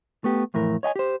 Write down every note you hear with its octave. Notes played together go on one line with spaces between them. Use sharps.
A3 B3 G4
F2 A2 E3 A#4
C#5 D#5 G5 G#5
G4 C5